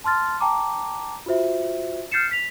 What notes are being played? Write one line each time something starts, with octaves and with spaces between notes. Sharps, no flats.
A5 C6 F6 A6
G5 A5 A#5 D6
F4 F#4 C5 E5
F6 G6 A6 C7 C#7 E7
B6 F7